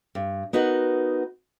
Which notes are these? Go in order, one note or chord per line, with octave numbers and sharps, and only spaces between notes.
G2
B3 D#4 F#4 A#4 F#5